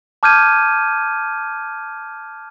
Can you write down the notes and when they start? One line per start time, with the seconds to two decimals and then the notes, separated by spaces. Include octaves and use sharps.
0.23 A5 D6 F6 G6 G#6 D#7